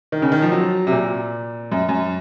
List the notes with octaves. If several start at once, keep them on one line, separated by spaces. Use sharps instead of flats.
D#3
C#3
D#3
F3
F#3
C3
A#2
F#2
F#2